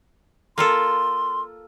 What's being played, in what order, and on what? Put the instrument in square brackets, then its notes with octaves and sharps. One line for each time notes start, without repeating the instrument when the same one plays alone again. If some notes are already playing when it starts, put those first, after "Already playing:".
[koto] A#3 F4 A4 [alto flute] C6